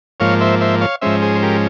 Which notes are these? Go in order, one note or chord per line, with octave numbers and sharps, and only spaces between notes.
G#2 F3 A#3 C#5 F5
C5 E5
C5 E5
C#5 F5
G#2 F3 G#3 C#4 C5 E5
G#4 C5
C5
G4 A#4